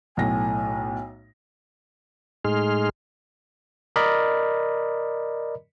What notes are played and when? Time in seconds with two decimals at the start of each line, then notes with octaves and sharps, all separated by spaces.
0.17 B1 A2 G#5 A#6
2.45 A2 G#3 D#4 G#4 C6 F6
3.96 A#4 D5 D#5 B5